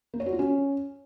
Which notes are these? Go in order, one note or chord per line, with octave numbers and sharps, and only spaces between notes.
A#3
C#5
F#4
F4
C#4